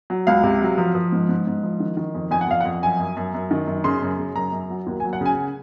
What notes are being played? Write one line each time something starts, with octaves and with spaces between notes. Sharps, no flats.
F#3
C#2 F5
C3
F#3
F3
F3
G#2
G#2
G#2
F3
D#3
D#3
F2
F2 G#5
F#5
F2 F5
F#5
F2
F#2 G#5
F#2
F#2
F#2
D#3
F#2
C#3 C6
F#2
C#3
F#2 A#5
F#2
F#3
D#2
G#5
F#3
F#5
C#3 G#5